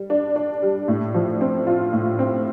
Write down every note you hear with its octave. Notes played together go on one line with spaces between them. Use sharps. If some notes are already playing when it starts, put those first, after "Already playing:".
Already playing: G3
D4
D4
G3
A2
F3
C4
F4
A2
C4